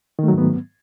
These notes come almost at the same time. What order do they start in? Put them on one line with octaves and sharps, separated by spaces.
D#3 A3 F#3 G#2 B3